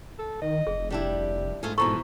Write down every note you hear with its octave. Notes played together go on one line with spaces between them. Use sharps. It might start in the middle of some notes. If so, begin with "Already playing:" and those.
A4
D#3 D#5
F1 G#4
G3 D4 E4 G4
G#2 A3 F4 G#4
B2 E3 F3 A4 A#5 C#6